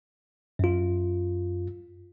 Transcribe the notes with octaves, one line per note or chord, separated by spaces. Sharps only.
F#2 F4